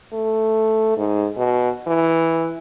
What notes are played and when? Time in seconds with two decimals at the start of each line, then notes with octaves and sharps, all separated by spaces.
0.13 A3
0.97 G#2
1.37 B2
1.87 E3